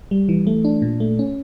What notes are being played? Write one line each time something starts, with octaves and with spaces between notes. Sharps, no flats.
G3
E3
A3
D4
A#2
A3
C#4